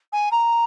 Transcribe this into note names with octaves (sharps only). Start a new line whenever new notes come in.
G#5
A#5